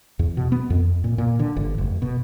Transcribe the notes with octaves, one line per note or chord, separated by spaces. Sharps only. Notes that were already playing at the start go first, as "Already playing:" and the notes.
E2
B2
B3
F2
A#2
A#2
D3
G1
F1
B2